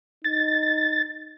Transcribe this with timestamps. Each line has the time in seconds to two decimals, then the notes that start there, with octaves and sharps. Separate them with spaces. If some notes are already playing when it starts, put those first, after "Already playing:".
0.24 D#4 A6